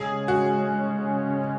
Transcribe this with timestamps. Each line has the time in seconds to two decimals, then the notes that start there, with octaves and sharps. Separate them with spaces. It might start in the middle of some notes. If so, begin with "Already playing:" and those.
Already playing: C#3 G#3 C#4 G#4
0.28 F#4